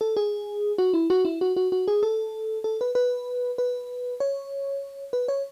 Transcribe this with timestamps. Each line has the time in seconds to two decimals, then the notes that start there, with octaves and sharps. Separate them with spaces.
0.01 A4
0.17 G#4
0.78 F#4
0.94 E4
1.10 F#4
1.25 E4
1.41 F#4
1.56 F#4
1.72 F#4
1.88 G#4
2.03 A4
2.64 A4
2.81 B4
2.95 B4
3.58 B4
4.20 C#5
5.13 B4
5.28 C#5